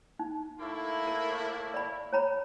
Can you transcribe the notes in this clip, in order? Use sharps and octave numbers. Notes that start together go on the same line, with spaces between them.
D#4
A2 A#3 E4
A#4
D5 B5
C#5 A#5 B5